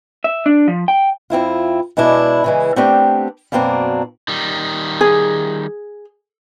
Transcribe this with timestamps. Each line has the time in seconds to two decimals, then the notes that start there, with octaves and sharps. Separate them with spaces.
0.24 E5
0.46 D4
0.68 F3
0.88 G5
1.30 F2 C4 E4 F4
1.97 B2 G#3 D4 E4
2.44 C#3 E3 G#3
2.76 A3 B3 C4 D4 G4
3.52 F#2 B2 A#3 C4 D4
4.28 D#3 G3
5.01 G#4